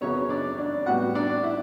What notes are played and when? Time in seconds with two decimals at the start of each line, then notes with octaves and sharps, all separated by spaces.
0.01 F#2 C#3 F#3 B3 C#4 C#5
0.29 D4 D5
0.58 D4 D5
0.86 A2 G3 B3 F#4 F#5
1.15 D4 D5
1.43 E4